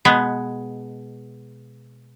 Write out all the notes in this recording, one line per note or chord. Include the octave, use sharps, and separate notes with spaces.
B2 G#3 B3